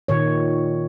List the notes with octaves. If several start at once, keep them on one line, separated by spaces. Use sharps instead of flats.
A#2 D#3 C#5